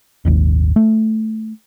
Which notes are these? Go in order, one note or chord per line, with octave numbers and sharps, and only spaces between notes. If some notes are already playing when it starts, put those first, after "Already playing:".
D#1 G#1 D#2
A3